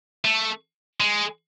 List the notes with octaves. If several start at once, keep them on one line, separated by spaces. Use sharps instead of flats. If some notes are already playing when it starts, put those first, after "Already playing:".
A3
G#3